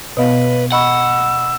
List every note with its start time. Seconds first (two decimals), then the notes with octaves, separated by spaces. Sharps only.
0.17 B2 B3 B4 C#5 D#5 F5
0.72 D#5 F#5 B5 C#6 E6